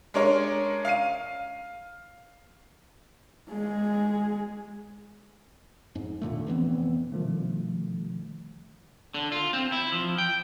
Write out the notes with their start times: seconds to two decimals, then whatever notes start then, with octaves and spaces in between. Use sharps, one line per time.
0.14 G#3 D4 A#4 C#5
0.85 F5 F6 C7 D#7
3.49 G#3 G#4
5.95 F2 G#2
6.21 D#2 A#2 D3 A3
6.47 F1 E3 B3 C4
7.12 B2 D3 D#3 F3 G3 A3
9.14 D3
9.32 F4
9.53 C4
9.72 E4
9.92 F3
10.18 G5